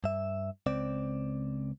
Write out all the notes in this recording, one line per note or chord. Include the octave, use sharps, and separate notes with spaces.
G2 E5
C#2 C4 D5